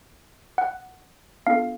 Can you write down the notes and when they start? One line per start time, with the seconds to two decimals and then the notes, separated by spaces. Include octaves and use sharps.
0.58 F#5
1.46 B3 D4 F4 A4 F5